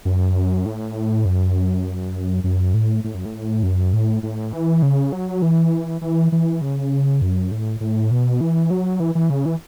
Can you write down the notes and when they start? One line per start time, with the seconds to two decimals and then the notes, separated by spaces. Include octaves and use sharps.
0.05 F#2
0.66 A2
1.25 F#2
2.44 F#2
2.74 A2
3.04 A2
3.15 F#2
3.25 A2
3.63 F#2
3.93 A2
4.23 A2
4.53 E3
4.82 C#3
5.12 F#3
5.42 E3
6.01 E3
6.32 E3
6.61 C#3
7.22 F#2
7.52 A2
7.81 A2
8.11 B2
8.41 E3
8.71 F#3
9.00 E3
9.15 E3
9.30 C#3
9.46 E3